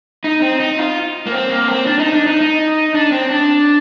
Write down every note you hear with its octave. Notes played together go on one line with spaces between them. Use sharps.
D#4
C4
D#4
F4
A#3
C4
A#3
C4
D4
D#4
D4
D#4
D#4
D4
C4
D4